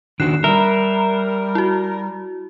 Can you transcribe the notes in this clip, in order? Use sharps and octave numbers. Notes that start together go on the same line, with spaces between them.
D#3 D4 F#4 F#6 C7 E7
G3 A#4 E5
E4 F#4